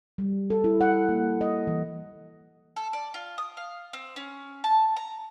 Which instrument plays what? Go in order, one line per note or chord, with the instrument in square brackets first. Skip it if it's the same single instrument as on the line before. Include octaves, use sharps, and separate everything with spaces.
[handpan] G3
A4
E4
F#5
A#3
D#5
E3
[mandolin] A4
D5
F4
D#6
F5
C4
C#4
A5
A#5